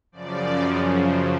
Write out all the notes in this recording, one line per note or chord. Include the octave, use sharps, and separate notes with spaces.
F#2 C#3 F3 D5